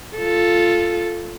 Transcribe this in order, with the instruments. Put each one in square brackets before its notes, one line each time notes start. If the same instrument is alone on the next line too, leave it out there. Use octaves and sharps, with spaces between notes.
[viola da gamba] F4 A4